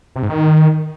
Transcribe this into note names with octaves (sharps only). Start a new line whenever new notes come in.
C3
G#2
D#3